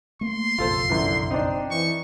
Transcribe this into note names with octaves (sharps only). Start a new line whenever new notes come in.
A3 A#3 C6
F#1 B1 F2 F4 A4 C5
F#2 D3 E3
C4 D4 D#4
E3 C#6